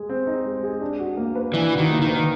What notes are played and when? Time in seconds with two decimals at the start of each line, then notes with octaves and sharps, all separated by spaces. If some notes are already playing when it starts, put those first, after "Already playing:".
Already playing: G#3 G#4
0.09 C4
0.27 D#4
0.46 G#3
0.63 G#4
0.81 D4
1.00 F#4
1.17 A#3
1.35 B4
1.53 E3 D4
1.72 F#4
1.78 D#3
1.90 A#3
2.02 D#3
2.08 B4